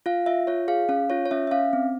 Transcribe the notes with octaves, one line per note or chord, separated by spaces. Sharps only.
F4 F5
F4 E5
F4 C#5
G#4 F5
C#4 F5
F4 C#5
C#5
C#4 E5
E5
C#4 F5
C4